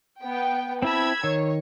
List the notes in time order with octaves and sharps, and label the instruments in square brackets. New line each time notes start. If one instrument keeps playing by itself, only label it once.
[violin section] B3 G5
[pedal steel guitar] C4 E4 A5 [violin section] B5 E6 G#6
[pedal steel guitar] D#3 [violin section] C#5